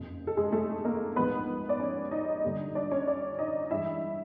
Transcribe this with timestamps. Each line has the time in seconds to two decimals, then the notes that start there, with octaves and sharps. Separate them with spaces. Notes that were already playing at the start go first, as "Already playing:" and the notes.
Already playing: F#1 F2 C3
0.27 A4
0.37 G#3 G#4
0.52 A3 A4
0.85 A#3 A#4
1.16 A#1 G#2 F3 A#3 B3 B4
1.69 D5
1.80 C#4 C#5
2.11 D#4 D#5
2.44 G2 D3 G3 A#3
2.75 D4 D5
2.91 C#4 C#5
3.07 D4 D5
3.39 D#4 D#5
3.70 G2 E3 G#3 E4 E5